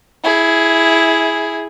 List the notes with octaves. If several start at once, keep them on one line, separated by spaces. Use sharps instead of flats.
E4 G#4